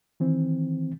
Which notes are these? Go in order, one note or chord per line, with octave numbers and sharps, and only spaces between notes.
D#3 E3 C4